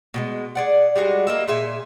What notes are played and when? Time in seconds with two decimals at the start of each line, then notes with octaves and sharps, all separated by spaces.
0.14 B2 D#3 G#3
0.55 G#4 D5 F#5
0.96 G3 G#3 F#4 G#4
1.27 A#3 D#5 E5
1.48 A#2 G#4 E5 G#5